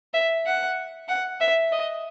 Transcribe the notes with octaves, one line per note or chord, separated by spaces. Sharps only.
E5
F#5
F#5
E5
D#5